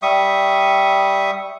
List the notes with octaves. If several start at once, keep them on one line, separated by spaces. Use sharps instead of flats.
G3 E5 C#6 D#6